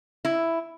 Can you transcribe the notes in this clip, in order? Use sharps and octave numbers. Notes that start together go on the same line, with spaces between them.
E4